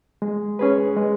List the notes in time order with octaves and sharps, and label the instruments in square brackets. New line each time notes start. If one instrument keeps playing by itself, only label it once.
[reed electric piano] G#3
C#4 G#4 B4
G#3